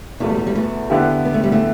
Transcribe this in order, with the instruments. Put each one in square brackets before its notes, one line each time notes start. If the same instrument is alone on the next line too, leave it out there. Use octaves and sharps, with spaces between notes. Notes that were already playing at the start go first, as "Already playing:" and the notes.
[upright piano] E2 B2 A3 [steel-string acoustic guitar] E3
[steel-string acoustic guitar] G3
E3
G3
E3 A3
[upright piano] D3 B3 E4 G4
[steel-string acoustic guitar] B3
A3
G3
E3 A3